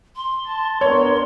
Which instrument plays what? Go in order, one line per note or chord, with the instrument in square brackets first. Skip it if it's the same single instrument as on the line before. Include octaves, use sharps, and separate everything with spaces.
[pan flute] C6
[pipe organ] A5
[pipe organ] B3 D4 A#4 [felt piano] C#5 [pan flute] C6